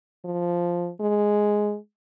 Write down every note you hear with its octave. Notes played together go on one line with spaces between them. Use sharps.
F3
G#3